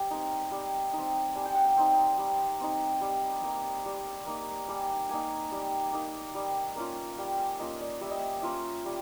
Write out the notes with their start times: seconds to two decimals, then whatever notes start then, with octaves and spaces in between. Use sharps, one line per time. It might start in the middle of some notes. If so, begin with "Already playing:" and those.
Already playing: G3 G#5
0.11 C4 D#4
0.51 G3
0.93 D#4
0.98 C4
1.35 G3 G#5
1.46 G5
1.55 F#5
1.65 G5
1.77 C4 D#4
2.18 G3
2.60 C4 D#4
3.01 G3
3.43 A#3 D#4
3.86 G3
4.26 A#3 D#4
4.68 G3 G#5
5.09 A#3 D#4 G#5
5.52 G3
5.93 A#3 D#4
6.35 G3
6.76 A#3 C#4 F4
7.18 G3 G5
7.38 G#5
7.59 A#3 C#4 F4 D#5
7.81 D5
8.01 G3 E5
8.11 D#5
8.19 E5
8.42 A#3 C#4 F4 E5
8.85 G3